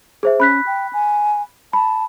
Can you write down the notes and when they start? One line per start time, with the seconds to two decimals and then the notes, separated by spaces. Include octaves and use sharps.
0.23 G#4 C5 E5
0.40 C#4 B5 F#6 B6
0.67 G5
0.93 G#5
1.73 A5 B5